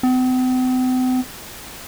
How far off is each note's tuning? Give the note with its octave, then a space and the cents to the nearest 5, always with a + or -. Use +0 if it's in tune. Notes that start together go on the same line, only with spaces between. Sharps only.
C4 -45